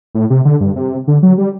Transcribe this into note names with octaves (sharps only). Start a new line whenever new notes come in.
A2
C3
D3
G2
C3
D3
F#3
G3